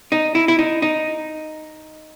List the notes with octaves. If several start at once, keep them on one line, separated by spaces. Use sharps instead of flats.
D#4
E4
E4
D#4
D#4